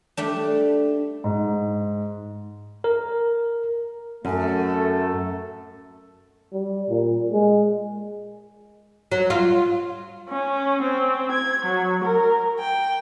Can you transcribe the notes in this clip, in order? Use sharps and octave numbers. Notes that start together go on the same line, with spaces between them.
G3 A3 D4
G#2
A#4
F#2 A3 A4
G3
A#2
G#3
F#3
F4
C#4
C4
G#6
F#3
A#4
G5